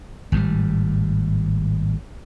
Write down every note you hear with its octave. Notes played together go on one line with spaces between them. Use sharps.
G#1 A2 D#3 G3